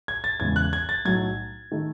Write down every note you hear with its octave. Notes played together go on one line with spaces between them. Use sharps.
G#6
A6
E2 C#3 G#3 G#6
F#6
G#6
A6
B1 A2 F#3 A3 G#6
D#3 A3